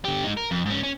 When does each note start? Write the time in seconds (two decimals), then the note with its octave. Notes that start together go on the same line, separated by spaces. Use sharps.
0.05 D3 G4
0.24 G#3 D#4
0.37 A#4
0.51 F2
0.66 G#2 C#4
0.83 C#4